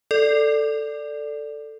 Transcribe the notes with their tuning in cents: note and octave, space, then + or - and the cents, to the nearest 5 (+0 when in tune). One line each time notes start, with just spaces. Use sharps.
A4 +10 D5 +0